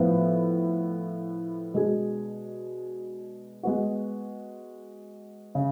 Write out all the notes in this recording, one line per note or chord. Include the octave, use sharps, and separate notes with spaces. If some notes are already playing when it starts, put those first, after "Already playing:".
Already playing: A2 F3 B3
B2 G#3 D4 G#4
G#3 B3 F#4
C#3